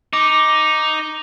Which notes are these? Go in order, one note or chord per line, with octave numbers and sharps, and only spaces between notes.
D#4 D6